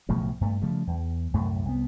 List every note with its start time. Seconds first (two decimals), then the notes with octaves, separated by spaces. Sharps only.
0.09 B1 A2 C#3 F3
0.41 G2 A3
0.62 C#3 F3 G3 A3
0.87 E2
1.33 C2 F#2 A2 A3
1.65 C2 F3 B3